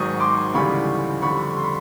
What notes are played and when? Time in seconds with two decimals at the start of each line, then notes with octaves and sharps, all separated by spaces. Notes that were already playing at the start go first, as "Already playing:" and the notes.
Already playing: G#1 G#2 D#3 F#3 C#6 D#6
0.20 C6 D6
0.54 D2 C#3 E3 G3 B5 C#6
1.22 F2 D3 G3 B5 C#6
1.56 C6
1.64 B5